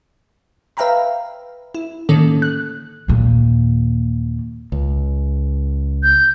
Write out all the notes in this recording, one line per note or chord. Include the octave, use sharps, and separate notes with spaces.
B4 E5 F5 G5 A#5 B5
E4
A2 D3 D#3 A#3 C#4 A4
F#6
D#2 A#2
C#2
G6